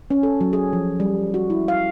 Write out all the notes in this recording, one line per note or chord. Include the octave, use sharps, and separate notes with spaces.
C#4
A4
F#3
G#4
F3
G3
F#4
E4
F5